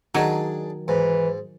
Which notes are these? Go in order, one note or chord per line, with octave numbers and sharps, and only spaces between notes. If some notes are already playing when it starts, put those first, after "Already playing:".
D#3 F#3 D4 G#4 G#5
G#2 E3